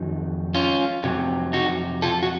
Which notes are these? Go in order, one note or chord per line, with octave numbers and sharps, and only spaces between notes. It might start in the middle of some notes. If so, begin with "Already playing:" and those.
Already playing: F2 D#3 F#3
C#4 F4
F2 C3 F#3
D#4 F#4
F4 A4
F#4